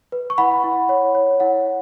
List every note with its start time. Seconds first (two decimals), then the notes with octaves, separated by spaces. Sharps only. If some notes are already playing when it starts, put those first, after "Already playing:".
0.12 B4
0.30 C#6
0.38 E4 F#5 B5
0.64 E4
0.89 C#5
1.15 C#5
1.40 E4 F#5
1.66 E4